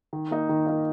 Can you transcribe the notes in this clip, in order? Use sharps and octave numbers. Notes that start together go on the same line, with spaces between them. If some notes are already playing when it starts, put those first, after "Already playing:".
D#3
A#3 D#4
D#3
A#3 D#4